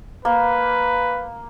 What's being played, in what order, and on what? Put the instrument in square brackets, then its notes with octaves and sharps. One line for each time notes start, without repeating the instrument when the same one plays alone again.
[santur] A#3 [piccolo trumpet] B4